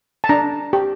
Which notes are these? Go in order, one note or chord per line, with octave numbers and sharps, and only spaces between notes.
A5
D4 A#5
G4